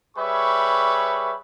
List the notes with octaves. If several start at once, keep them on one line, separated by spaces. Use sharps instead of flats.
G3 G#4 B4 C#5 E5 C#6